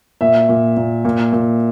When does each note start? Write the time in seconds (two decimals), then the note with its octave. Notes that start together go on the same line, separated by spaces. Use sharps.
0.21 A#2 E5
0.49 A#2
0.77 A#2
1.05 A#2
1.32 A#2